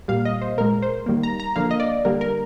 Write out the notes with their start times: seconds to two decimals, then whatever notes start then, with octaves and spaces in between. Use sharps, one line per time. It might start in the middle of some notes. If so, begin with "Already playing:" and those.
0.08 A#2 G3 A#3 F5
0.25 D#5
0.41 C5
0.57 A#2 G#3 A#4
0.82 C5
1.06 D#3 G3 A#3
1.23 A#5
1.40 A#5
1.56 D3 F3 A#3 F5
1.71 D#5
1.80 D5
2.05 D3 G3 A#3 A#4
2.21 A#4